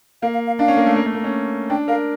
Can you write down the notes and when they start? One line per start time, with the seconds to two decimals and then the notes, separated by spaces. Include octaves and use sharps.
0.22 A#3 F5
0.34 F5
0.47 F5
0.59 D4 F5
0.68 C#4
0.77 A#3
0.86 A3
0.96 A#3
1.05 A3
1.14 A#3
1.24 C#4
1.70 D4 G5
1.88 A#4 F5